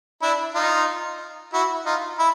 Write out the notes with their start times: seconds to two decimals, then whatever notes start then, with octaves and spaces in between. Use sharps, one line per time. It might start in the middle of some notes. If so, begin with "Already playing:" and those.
0.22 D4 E4
0.55 D#4 F4
1.53 E4 F#4
1.85 D#4 F4
2.19 E4